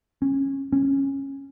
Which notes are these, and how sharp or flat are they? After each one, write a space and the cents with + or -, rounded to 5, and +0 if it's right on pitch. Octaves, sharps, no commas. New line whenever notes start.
C#4 -20
C#4 -15